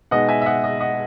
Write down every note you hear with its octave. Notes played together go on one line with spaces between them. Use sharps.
B2 G#3 D#4 D#5 F#5
E5 G#5
E5
D#5 F#5
D#5
D#5 F#5